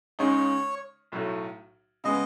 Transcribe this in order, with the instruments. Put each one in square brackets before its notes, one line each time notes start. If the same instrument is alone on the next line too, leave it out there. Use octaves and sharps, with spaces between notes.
[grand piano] C#2 C#3 G#3 D#4 [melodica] C#5
[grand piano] B1 A2 F#3 A3
[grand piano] C#3 G#3 B3 [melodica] D#5